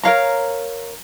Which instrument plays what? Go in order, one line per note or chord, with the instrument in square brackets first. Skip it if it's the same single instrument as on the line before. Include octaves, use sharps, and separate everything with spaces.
[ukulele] A#4 C#5 F5 A#5